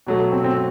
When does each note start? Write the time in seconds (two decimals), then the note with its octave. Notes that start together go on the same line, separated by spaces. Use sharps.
0.07 B2 F#3 A3
0.32 C4
0.44 C4